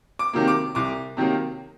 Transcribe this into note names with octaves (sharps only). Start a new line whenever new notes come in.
D6
C3 D#3 F#3 A#3
D6
C2 D6
C3 D#3 F#3 A#3